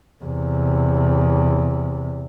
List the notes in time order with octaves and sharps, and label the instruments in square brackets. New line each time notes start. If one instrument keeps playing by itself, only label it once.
[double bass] E2 C3